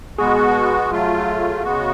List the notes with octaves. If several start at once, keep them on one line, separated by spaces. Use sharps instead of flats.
B2 G#3 B3 F#4 G#4
F#3 A3 F4
C#3 G#3 B3 F#4